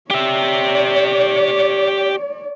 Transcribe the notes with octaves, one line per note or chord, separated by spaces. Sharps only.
G4 C#5 D5 E5